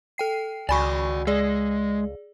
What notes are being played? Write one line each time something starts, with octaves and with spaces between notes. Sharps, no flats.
A4 G5 C7
C#2 F#4 D5 G#5 B5 C#6
G#3 G#4 D5